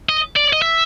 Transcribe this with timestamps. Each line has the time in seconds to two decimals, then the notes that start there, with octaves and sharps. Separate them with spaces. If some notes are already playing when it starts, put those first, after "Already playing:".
0.09 D#5
0.36 D5
0.53 D#5
0.62 E5